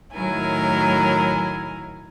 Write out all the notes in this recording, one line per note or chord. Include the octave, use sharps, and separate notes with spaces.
A2 D#3 F#3 E4 A#4 G#5